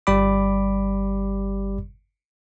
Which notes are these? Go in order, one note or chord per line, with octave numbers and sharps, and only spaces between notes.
G1 G3 G4 D5 B5 D6